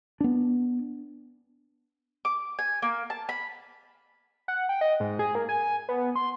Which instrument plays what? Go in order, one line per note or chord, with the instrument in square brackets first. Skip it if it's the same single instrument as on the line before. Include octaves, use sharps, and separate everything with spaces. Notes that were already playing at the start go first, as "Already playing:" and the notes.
[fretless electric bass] B3 D4
[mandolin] D6
G#5
A#3
A5
B5
[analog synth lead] F#5
G5
D#5
G#2
G#4
A#3
G#5
B3
C6